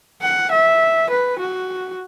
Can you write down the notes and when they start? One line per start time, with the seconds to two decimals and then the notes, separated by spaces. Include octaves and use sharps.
0.22 F#5
0.51 E5
1.10 B4
1.39 F#4